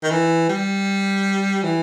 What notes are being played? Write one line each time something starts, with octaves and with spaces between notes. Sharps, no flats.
D#3
E3
G3
E3